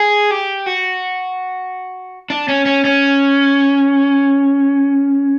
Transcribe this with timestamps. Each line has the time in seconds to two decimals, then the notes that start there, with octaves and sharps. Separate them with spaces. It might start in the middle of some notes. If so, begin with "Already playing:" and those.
Already playing: G#4
0.31 G4
0.66 F#4
2.30 D4
2.48 C#4
2.66 C#4
2.84 C#4